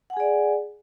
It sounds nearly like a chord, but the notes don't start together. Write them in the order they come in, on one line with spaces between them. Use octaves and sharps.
F#5 G#5 G#4 D5